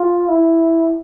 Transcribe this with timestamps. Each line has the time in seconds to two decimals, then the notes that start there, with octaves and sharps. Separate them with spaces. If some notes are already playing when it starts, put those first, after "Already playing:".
Already playing: F4
0.29 E4